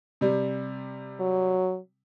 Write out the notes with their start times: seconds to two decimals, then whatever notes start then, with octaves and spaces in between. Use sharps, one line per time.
0.21 C3 G3
1.20 F#3